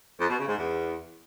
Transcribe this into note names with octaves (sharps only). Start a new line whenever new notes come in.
F2
B2
C#3
G#2
E2